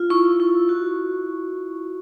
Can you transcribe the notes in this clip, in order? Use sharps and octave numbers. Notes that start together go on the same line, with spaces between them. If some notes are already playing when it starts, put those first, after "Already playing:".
Already playing: F4
E4 C#6
E4
F#4